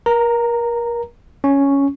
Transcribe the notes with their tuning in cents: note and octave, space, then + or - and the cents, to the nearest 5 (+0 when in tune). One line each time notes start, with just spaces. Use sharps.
A#4 +30 A#5 -10
C#4 +5 C#6 +0